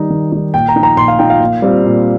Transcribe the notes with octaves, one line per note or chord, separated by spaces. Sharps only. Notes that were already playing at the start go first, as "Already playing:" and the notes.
Already playing: D#3 G3 D#4
D#3
G3 D#4
A#2 G5
A#5
F3 D#4
A#5
A#2 C6
F5
F3 D#4 G5
F5
A#2
G3 C4 F4
A#2